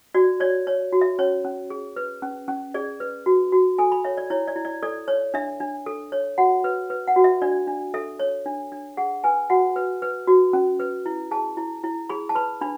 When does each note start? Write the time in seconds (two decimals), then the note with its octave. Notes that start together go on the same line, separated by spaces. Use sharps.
0.14 F#4 D5
0.40 C#5 D5
0.67 C#5
0.92 F#4
1.01 E5
1.19 C#4 C#5
1.45 C#4
1.70 G#4
1.96 B4
2.22 C#4
2.48 C#4
2.74 G#4 D5
3.00 B4
3.26 F#4
3.52 F#4
3.78 A4 G#5
3.92 B5
4.05 C#5 E5
4.17 D5
4.30 E4 C#5
4.48 D5
4.56 E4
4.65 D5
4.83 A4 D5
5.08 C#5
5.34 D4 E5
5.60 D4
5.86 A4
6.12 C#5
6.38 F#4 F#5
6.64 B4
6.90 B4
7.08 F#5
7.16 F#4
7.24 E5
7.42 D4 D5
7.67 D4
7.94 A4 E5
8.19 C#5
8.46 D4
8.72 D4
8.97 G#4 F#5
9.24 B4 G#5
9.50 F#4 F#5
9.76 B4
10.02 B4
10.27 F#4
10.53 C#4
10.80 B4
11.06 E4
11.31 G#4 A5
11.57 E4
11.84 E4
12.09 G#4 B5
12.29 A5
12.35 B4 B5
12.61 D4 B5